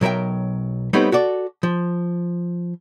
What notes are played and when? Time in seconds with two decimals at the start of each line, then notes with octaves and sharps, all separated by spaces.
0.01 B1 F#3 A#4 E5 G5
0.93 G3 A3 B3 C4 D#4 C#5
1.12 F#4 A4 D5
1.63 F3